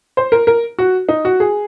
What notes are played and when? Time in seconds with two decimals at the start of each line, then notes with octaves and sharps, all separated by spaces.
0.17 C5
0.32 A#4
0.47 A#4
0.79 F#4
1.09 D#4
1.25 F#4
1.40 G#4